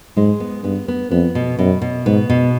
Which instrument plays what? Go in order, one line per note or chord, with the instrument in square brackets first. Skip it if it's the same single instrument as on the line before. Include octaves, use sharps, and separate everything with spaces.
[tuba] G#2 [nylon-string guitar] G#3
[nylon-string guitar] B3
[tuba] G2 [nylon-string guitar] B3
[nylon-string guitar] B3
[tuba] F2 [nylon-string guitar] B3
[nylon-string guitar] B2
[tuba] F#2 [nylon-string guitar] B2
[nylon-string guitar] B2
[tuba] G#2 [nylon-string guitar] B3
[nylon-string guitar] B2